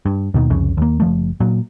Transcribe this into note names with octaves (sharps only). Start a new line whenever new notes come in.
G2
D#2 B2 D#3
C2 F2 C#3
D#2 A#3
F#1 F3 A3
A#2 F#3